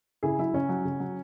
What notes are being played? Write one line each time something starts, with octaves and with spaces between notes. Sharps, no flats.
C#3 E4 G#4
F#3 E4
C#3 C#4
F#3
C#3
F#3